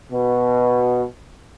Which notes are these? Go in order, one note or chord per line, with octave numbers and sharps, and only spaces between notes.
B2